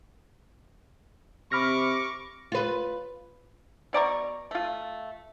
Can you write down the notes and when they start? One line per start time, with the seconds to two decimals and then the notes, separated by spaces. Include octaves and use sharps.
1.52 C3 B5 C#6 D6 F6 A#6
2.52 F4 B4
3.93 B2 D5 A#5 C#6
4.51 A3 F4